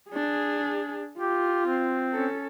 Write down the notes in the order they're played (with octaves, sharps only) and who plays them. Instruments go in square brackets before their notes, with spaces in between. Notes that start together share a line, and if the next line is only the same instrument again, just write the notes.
[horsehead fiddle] D4 G#4
[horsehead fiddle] F4 [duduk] G4
[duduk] C4
[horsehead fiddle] C#4 A4